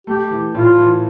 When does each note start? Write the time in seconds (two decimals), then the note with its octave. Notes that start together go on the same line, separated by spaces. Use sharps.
0.07 A3 G4
0.31 E3
0.55 A2 F4
0.78 E3